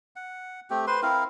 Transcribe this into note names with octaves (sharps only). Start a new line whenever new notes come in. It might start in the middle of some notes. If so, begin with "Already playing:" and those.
F#5
A3 C4 G4
B4 C5 C6
C4 E4 A#4 F5